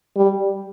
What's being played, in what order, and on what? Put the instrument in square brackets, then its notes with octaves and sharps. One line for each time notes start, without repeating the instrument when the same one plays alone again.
[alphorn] G3